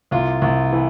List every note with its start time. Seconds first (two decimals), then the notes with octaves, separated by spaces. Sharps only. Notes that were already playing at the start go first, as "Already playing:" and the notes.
0.11 C2 F4
0.42 C2
0.72 E3